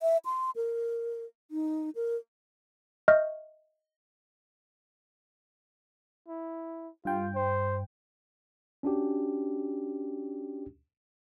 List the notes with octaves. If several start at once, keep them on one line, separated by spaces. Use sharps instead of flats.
E5
C6
A#4
D#4
A#4
D#5 E5 C#6 F6 G6
E4
G2 F4 G5
C5
C#4 D4 F#4 G4